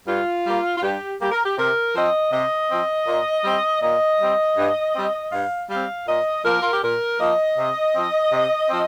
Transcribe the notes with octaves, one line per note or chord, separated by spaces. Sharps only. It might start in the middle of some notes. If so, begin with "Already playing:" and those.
G2 F4
G3 A#3
F4
G2 G4
G3 A#3 G4
A#4
G4
C3 A#4
F3 C4 D#5
C3 D#5
F3 C4
A#2
G3 C4
A#2 D#5
G3 C4
G2
G3 C4
G2 F5
G3 C4 F5
A#2 D#5
F3 A#3 A#4
F4
G4
A#2 A#4
F3 A#3 D#5
C3
F3 C4
C3
F3 C4